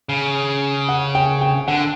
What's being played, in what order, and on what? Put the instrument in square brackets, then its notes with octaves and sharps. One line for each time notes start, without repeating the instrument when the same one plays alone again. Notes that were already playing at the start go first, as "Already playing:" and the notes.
[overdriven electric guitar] C#3
[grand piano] F#5
G5
G5
[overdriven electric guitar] D3 [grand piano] F#5